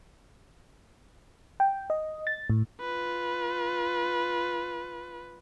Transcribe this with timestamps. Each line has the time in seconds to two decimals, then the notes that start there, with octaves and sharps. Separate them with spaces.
1.60 G5
1.90 D#5
2.27 A6
2.50 A2
2.81 F4 B4